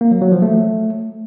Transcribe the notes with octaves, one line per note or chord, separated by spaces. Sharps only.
A#3
F#3
F#3
F3
A3